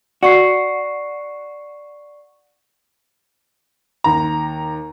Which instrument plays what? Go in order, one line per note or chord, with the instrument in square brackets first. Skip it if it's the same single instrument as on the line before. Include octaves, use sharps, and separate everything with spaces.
[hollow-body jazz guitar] F#4 [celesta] D5 C#6 C7
[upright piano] D#2 A#5